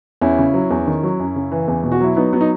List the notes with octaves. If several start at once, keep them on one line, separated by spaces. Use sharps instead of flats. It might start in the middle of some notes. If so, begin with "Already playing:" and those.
E2 C#4 E4
C#3
F#3
E2
D#3
F#3
F#2
C#3
E3
E2
B2
F#4
F#3 E4
F#3 B3 D#4
F#3 B3
D#4